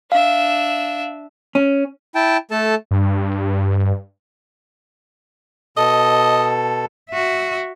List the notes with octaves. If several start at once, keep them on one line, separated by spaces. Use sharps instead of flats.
D4 E5 F5
C#4
E4 G5 A5
A3 A4 A5
G2
B2 A4 D#5
F#4 E5